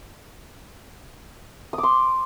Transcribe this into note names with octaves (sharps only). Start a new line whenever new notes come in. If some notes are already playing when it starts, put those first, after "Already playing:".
D#6
D6
C6